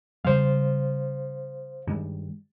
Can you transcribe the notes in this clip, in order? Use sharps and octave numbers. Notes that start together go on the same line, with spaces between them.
C#3 G3 G#3 C5 F5
G2 D#3 G#3